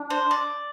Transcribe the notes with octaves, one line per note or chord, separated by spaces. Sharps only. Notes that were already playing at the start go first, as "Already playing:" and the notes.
Already playing: D4
C5
D5